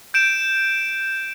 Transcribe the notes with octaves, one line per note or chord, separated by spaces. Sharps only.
G6 D7 E7